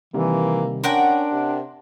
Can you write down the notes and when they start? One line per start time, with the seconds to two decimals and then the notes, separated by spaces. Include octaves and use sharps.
0.14 C3 D#3 E3 G3 A#3
0.84 C#4 D4 A#4 F#5 G5 C6
1.32 C3